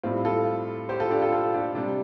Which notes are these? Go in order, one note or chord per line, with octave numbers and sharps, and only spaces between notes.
A2 G3 C4 F4
F4 A4
G4 C5
F4 A4
D4 G4
F4 A4
F4 A4
D4 G4
C3 G3 D4